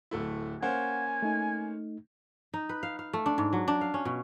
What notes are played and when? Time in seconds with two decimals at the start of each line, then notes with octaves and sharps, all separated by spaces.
0.11 D1 A3 E4
0.62 A#3 C#4 C5 F#5 G#5
1.22 A3 D#4
2.54 D#4
2.69 B4
2.83 F5
2.99 F5
3.13 A3
3.26 D4
3.38 G#2
3.53 F#3
3.68 D4
3.81 F5
3.94 C#4
4.05 B2